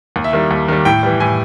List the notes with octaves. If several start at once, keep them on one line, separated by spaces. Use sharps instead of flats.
D#2
E5
D#3 G3
D#2
D#3 G3
A2 G5
E3 G3
A2 G#5